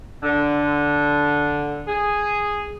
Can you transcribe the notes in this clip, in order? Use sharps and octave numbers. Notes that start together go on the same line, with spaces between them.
D3
G#4